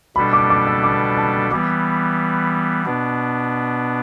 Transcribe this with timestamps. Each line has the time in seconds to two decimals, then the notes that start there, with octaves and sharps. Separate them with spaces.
0.16 B2 G3 D4 A4 B5
0.33 D6
0.50 D6
0.67 E6
0.83 D6
1.17 A5
1.51 E3 G3 B3 D6
2.86 B2 B3 D4